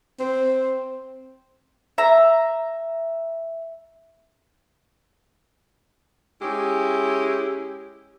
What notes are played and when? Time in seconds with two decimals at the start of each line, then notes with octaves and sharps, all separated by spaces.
0.20 C4
1.98 E5 A#5
6.42 G#3 C#4 E4 G4